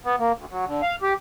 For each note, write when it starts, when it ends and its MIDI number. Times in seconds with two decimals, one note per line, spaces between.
0.05 0.16 59
0.19 0.32 58
0.37 0.45 38
0.50 0.65 54
0.66 0.82 50
0.82 0.96 77
1.02 1.13 67